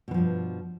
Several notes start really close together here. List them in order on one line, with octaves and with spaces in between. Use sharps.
B2 E3 F3 G2